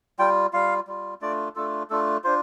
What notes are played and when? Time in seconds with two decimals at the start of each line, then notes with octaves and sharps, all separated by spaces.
0.19 G3 F4 G5
0.53 G3 F4 F5
0.87 G3 F4
1.22 A3 D4 F4 D5
1.55 A3 D4 F4 A4
1.90 A3 D4 F4 A4
2.24 D4 F4 C5